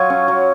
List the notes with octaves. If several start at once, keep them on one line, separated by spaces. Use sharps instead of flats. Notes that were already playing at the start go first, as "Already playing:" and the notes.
Already playing: F#3 F4 G#5
C#4
F#3